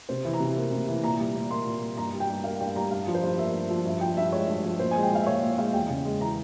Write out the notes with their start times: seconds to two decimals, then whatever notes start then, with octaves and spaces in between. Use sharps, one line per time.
0.09 C3 C5
0.25 E3
0.33 A#5
0.40 C3
0.57 A#3
0.72 C3
0.88 E3
1.04 A#2 A#5
1.20 G3
1.35 A#2
1.51 A#3 C6
1.66 A#2
1.82 G3
1.97 G2 A#5
2.13 G3
2.20 G5
2.29 G2
2.44 A#3 F5
2.60 G2 G5
2.76 G3 A#5
2.91 G2 F5
3.07 F3
3.14 C5
3.23 G2
3.38 A#3 E5
3.54 G2
3.70 F3
3.86 G2 E5
4.01 F3 G5
4.17 G2 E5
4.32 G#3 C#5
4.48 G2
4.64 F3
4.80 A#2 C5
4.91 G#3 G#5
5.03 G5
5.11 G#3 F5
5.21 E5
5.27 A#2 C#5
5.42 A#2 E5
5.58 G#3 F5
5.74 E2 G5
5.89 C#3
6.05 G#3
6.21 E3 A#5